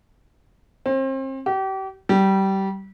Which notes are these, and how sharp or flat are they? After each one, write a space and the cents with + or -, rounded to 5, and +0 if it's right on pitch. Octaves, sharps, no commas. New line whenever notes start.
C4 +35
G4 -35
G3 -20